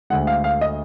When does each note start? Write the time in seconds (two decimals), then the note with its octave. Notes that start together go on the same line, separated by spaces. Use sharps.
0.10 D2 D3 G#3 F#5
0.27 F5
0.44 F5
0.61 D#5